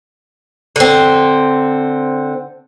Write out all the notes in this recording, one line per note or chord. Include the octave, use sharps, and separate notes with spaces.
D3 C4